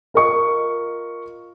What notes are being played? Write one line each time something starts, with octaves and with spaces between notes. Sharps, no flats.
F4 A#4 D#5 C#6